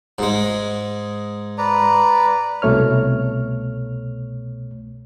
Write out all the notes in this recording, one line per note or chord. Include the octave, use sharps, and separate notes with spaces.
G#2 G#3
B4 D5 A#5
C2 B2 A3 C#5 F6